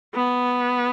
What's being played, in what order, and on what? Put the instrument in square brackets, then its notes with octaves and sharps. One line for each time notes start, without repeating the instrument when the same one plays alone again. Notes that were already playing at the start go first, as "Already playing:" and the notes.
[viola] B3